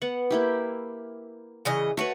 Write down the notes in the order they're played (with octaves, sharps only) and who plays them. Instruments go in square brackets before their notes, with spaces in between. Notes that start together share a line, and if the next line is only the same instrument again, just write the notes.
[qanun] B3 F#5
A#3 E4 G4
[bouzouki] C#3 E3 D#5
[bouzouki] A3 C#5 [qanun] F#4 B4